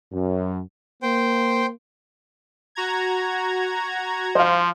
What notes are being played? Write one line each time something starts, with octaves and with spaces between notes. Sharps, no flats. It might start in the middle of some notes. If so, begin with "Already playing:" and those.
F#2
A#3 C5 G5
F#4 A#5 G#6
F3 C5 F5